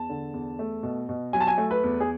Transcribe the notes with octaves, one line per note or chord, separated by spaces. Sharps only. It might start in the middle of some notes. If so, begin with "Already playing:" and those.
Already playing: E2 A5
D3
E2
A3
B2
B2
F#3 G#5
A5
G#5
A3
B4
E2
G#4